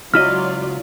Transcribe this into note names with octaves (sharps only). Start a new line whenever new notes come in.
C#2 F#3 E4 F4 D5 D#5 F6